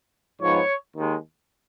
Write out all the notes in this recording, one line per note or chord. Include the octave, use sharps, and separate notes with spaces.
G#2 F3 B3 C#5
D#2 D#3 G#3